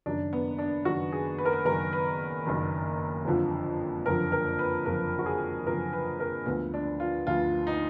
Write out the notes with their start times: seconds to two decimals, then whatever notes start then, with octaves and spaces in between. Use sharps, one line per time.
0.06 F#1 F#2 D#3 D4
0.33 B3
0.58 D4
0.85 F#1 F#2 D#3 F#4
1.12 G#4
1.38 B4
1.45 A#4
1.53 B4
1.65 F#1 F#2 D#3 A#4
1.93 B4
2.46 F#1 F#2 D#3
3.25 F#1 F2 D3 F3
4.06 F#1 F2 D3 F3 A#4
4.32 A#4
4.59 B4
4.86 F#1 F2 D3 F3 A#4
5.19 F#4
5.26 G#4
5.66 F#1 F2 D3 F3 A#4
5.93 B4
6.20 A#4
6.46 D2 D3 F3 B3
6.74 D4
7.00 F4
7.27 D2 D3 F3 F4
7.67 D#4